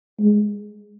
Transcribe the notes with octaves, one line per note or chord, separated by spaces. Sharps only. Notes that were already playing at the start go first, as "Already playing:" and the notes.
G#3